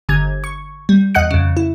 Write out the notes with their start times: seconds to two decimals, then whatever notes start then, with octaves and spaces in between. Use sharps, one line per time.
0.09 G1 D3 G#6
0.44 C#6
0.89 G3
1.15 E2 D#5 F#5 F#6 C#7
1.31 F2 C#3
1.57 E4